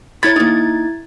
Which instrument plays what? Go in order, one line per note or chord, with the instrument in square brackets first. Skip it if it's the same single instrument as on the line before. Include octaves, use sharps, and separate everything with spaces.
[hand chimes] E4 G#6 A6 [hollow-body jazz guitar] C#5 B5
[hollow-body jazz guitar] A#3 D#4